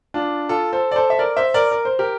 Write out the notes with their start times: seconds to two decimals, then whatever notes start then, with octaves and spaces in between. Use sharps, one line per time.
0.14 D4 F4
0.49 F4 A4
0.73 A4 C5
0.91 D5
0.96 A4 C5
1.10 E5
1.19 A#4 D5
1.37 C5 E5
1.54 A#4 D5
1.72 A#4
1.85 C5
1.99 G4 A#4